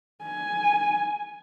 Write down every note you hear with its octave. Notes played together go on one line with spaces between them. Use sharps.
G#5